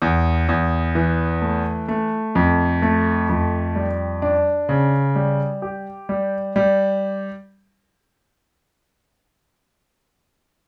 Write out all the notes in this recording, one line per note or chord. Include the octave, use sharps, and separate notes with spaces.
E2
E2
E3
A3
A3
F2
A3
F2
G3
D4
C#3
G3
G4
G3
G3